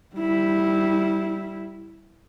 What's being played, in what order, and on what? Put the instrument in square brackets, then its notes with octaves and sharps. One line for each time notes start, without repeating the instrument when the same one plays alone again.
[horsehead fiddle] G3 E4